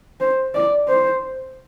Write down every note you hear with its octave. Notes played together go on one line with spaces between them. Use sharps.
C5
D5
C5